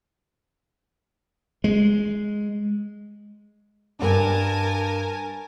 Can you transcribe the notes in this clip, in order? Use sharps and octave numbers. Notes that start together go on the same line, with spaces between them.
G#3
G2 D4 A#4 G#5 A5